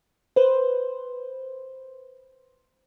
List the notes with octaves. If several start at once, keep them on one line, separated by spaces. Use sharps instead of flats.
B4 C5